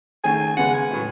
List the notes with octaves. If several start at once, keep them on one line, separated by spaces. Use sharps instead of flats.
D#3 A3 C#4 G#4 G#5
C#3 G#3 B3 F#5
G#5
A2 F#3 A3